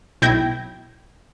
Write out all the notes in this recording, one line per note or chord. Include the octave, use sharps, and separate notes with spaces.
B1 E4 G5 G6 G#6 A#6